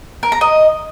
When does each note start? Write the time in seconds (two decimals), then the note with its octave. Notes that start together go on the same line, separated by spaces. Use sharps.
0.23 A#4
0.32 A#5
0.41 D#5